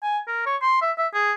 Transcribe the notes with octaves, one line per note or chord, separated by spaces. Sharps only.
G#5
A#4
C#5
C6
E5
E5
G#4